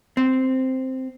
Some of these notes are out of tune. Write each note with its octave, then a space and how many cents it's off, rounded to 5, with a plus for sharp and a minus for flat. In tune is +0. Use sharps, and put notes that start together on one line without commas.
C4 -5